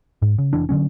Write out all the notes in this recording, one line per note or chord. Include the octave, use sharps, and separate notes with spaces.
G#2
C#3
F1 E3 D4
D3 D#3 F#3 C#4